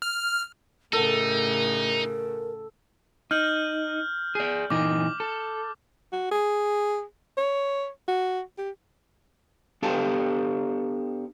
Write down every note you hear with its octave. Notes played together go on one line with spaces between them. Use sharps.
F6
A2 C#3 D#4 A4 A#4 F#5
D#4 F6 G6 F#7
G#4 D5
A#2 E3 D#4 D6
A4
F#4
G#4
C#5
F#4
G4
B3 D4 G4 A4 F5 A5